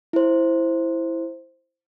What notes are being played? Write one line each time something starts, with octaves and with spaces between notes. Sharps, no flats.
E4 C5